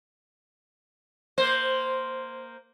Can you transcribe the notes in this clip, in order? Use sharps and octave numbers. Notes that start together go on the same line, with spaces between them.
A#3 C5